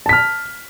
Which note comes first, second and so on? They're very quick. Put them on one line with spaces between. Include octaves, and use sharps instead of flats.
A5 B6 F6